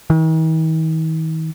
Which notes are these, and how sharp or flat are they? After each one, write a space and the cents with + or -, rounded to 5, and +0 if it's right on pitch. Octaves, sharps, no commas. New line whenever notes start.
D#3 +45